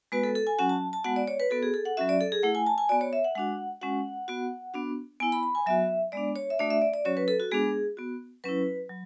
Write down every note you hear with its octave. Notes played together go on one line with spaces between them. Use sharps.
G#3 B3 F#4 B4
A4
A4
G#5
F#3 C#4 F#4 F#5
A5
A5
G#3 B3 F#4 F#5
D5
C#5
B4
B3 F#4 A4
G#4
A4
F#5
F#3 C#4 F#4 E5
D5
A4
G#4
A3 E4 F#5
G#5
A5
G#5
B3 F#4 D5
C#5
E5
F#5
G#3 D4 F#4 F#5
G#3 C#4 F#4 F#5
B3 F#4
B3 D4 F#4
B3 E4 G#5
B5
B5
G#5
F#3 B3 F#4 E5
G#3 B3 D4 D5
C#5
E5
A3 D4 F#4 D5
E5
D5
D5
F#3 C#4 F#4 C#5
B4
A4
F#4
G#3 B3 D4 G#4
B3 F#4
F#3 C#4 E4 B4
F#3